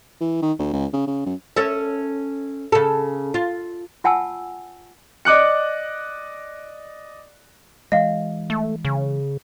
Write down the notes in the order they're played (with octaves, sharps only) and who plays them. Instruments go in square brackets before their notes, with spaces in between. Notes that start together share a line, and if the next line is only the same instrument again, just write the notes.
[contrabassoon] E3
D#3
D2
C#2
C#3
C#3
F#2
[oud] C#4 A4 E5
C#3 A4
F4
[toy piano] F4 F#5 G#5 A5 E6
[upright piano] D5 D#5 D6 F#6 C#7
[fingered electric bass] E3 G#3 [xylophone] D#5 F5
[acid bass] A3
C#3